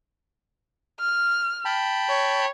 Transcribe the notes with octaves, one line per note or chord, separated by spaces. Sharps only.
F6
G5 A5 B5
C#5